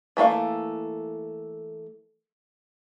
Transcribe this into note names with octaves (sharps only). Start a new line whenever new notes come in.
E3 A3 A#3 F5